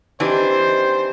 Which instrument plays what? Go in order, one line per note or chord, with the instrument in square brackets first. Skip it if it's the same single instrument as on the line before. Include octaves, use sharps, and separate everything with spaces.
[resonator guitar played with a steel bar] E3 D4 [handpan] C4 D#4 G4 [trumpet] C5